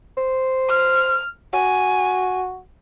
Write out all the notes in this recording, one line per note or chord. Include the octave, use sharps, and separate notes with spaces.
C5
F6
F#4 G#5